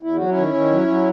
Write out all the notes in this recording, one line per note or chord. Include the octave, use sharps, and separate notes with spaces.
E2 E4
F#3 F#4
C#4 E4
D#3
D#3
F#3
F#3